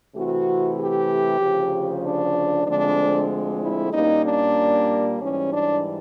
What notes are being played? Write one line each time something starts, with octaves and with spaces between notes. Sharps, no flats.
C3 E3 A3 C4 F#4
G4
D2 C#3 F3
D4
D2 D3 F3 G#3 C4 D4
E4
A#2 G3 A#3 C#4 D#4
D4
G#2 E3 G3 C#4
D4